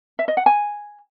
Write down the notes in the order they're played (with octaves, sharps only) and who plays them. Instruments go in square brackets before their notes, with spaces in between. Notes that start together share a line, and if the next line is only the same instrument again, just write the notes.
[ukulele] E5
D#5
F#5
G#5